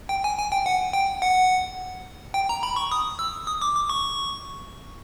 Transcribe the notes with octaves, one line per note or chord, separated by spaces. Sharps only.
G5
G#5
G#5
G5
F#5
G5
F#5
G5
A#5
B5
C#6
D#6
E6
D#6
D6
D6
C#6